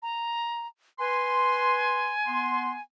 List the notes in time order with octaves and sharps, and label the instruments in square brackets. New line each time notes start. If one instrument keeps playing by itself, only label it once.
[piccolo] A#5
[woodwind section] B4 C6 [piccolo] G#5
[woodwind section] B3 F#5 C6